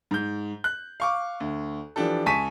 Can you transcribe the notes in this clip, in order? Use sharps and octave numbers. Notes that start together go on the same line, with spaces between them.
G#2 G6
F#6
F5 C#6 D6
D2
E3 F3 D4 G4 A4
C#2 G#5 A5 C#6 B6 D#7